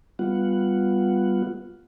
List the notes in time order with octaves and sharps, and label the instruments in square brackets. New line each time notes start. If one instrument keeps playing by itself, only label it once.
[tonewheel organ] G3 B3 F4 F#5